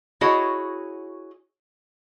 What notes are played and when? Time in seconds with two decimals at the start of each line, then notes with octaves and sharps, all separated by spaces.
0.21 E4 F#4 G#4 C#5 D#5 A5